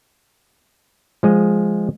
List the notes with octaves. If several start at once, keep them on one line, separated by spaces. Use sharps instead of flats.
F3 G#3 D#5